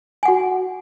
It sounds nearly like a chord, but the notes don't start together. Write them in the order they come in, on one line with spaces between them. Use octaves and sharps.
G#5 F#5 F#4